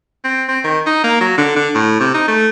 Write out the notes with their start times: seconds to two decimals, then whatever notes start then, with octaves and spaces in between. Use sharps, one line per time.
0.24 C4
0.48 C4
0.64 D#3
0.87 D#4
1.04 A#3
1.21 F#3
1.38 D3
1.56 D3
1.75 A2
2.00 C3
2.14 D#4
2.28 A3